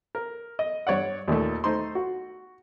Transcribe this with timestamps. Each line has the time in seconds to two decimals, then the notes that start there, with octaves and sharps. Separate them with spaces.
0.15 A#4
0.59 D#5
0.87 G2 C#5 D5 F#5
1.28 D#2 A#2 D#3 A3
1.64 A3 D#4 C5 C6
1.95 F#4